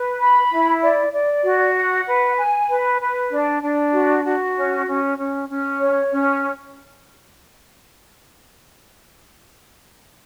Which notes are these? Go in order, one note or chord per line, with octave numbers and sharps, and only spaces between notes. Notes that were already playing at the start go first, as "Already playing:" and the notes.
Already playing: B4
B5
E4
D5
D5
F#4
F#5
B4
G#5
B4
B4
D4
D4
F#4
F#4
C#4
C#4
C#4
C#4
C#5
C#4